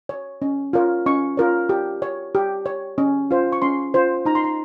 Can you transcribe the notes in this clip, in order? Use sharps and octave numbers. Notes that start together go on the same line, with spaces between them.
C#5
C#4
F4 A#4 C#5
C#4 C#6
F4 A#4 C#5
G4
C#5
G4
C#5
C#4
F4 C5
C#6
C#4 C6
F4 C5
D#4 A#5
C6
A#5